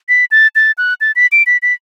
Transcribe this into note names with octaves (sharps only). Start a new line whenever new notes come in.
B6
A6
A6
F#6
A6
B6
D7
B6
B6